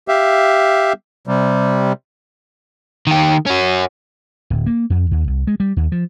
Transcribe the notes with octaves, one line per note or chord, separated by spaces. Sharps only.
G4 E5 F5
C3 G3
D#3 G4
C#4 F#4
D1
A#3
F2
D#2
C2
G#3
G3
D#2
F3